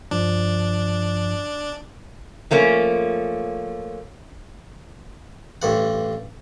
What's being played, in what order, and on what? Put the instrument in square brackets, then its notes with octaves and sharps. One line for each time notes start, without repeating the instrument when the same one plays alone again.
[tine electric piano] G2 F3 [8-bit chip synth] D4
[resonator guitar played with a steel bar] F3 A3 A#3 C#4
[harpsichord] A1 G2 F#5